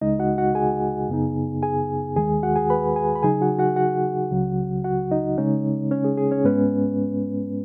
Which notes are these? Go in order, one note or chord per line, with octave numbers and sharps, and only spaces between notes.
C#2 C#3 G#3 D#4 D#5
F#4 F#5
F#4 F#5
G#4 G#5
F#2 C#3 B3 D#4
G#4 G#5
D#2 D#3 G#3 G#4 G#5
F#4 F#5
G#4 G#5
B4 B5
G#4 G#5
B5
C#3 F#3 D#4 G#4 G#5
F#4 F#5
F#4 F#5
F#4 F#5
C#2 C#3 F#3
F#4 F#5
D#4 D#5
C#3 G#3 C#4 D#4 C#5
C#4 C#5
G#4
G#4
C#4 C#5
G#2 G#3 B3 C#4 B4